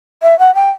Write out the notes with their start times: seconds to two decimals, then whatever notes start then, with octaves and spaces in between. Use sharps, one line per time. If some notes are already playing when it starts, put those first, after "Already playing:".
0.22 E5
0.39 F#5
0.55 G5